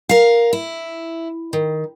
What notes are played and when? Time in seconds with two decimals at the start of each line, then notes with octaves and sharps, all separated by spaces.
0.09 A#4 F5
0.53 E4
1.53 D#3